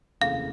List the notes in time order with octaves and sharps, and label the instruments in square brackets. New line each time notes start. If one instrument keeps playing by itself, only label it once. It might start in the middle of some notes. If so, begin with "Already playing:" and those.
[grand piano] F1 D#2 C#3 E3 A3 [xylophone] F5